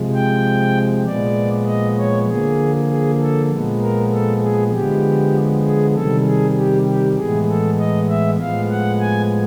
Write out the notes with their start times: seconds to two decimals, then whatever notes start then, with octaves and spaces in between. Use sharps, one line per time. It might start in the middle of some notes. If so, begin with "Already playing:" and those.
Already playing: C3 F3 G#3
0.14 G5
1.06 A#2 F3 G#3 B3 D5
1.67 D#5
1.98 C#5
2.29 D3 F3 A#3 G#4
2.90 G#4
3.20 A4
3.51 A#2 F3 G#3 B3
3.81 A#4
4.12 A4
4.42 G#4
4.73 D3 F3 G#3 B3 G4
5.65 G#4
5.95 C3 D#3 G3 A4
6.26 G#4
6.57 G4
6.87 G4
7.17 A2 E3 G#3 B3 G#4
7.49 A4
7.79 D#5
8.09 E5
8.40 A2 F3 G#3 B3 F5
8.71 F#5
9.01 G#5